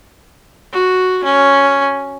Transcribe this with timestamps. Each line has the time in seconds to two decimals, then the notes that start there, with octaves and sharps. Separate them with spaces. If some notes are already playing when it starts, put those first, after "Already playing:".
0.73 F#4
1.24 C#4